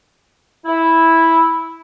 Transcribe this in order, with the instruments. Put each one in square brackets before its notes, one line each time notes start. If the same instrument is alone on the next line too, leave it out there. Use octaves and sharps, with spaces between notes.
[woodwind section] E4